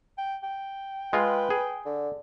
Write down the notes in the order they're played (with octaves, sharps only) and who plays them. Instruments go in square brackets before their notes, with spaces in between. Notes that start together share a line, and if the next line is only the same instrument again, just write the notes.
[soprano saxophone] G5
G5
[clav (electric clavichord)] G#3 F4 [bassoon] B4
[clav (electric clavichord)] G#4
[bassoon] D3